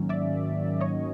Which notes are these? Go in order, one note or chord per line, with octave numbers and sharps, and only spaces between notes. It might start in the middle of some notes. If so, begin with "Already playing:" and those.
Already playing: G#2 D#3 F#3 A#3 C#4
D5 E5
C#5 D#5